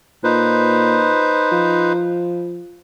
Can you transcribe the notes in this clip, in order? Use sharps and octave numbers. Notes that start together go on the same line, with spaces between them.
A#2 D#4 B4 C5
F3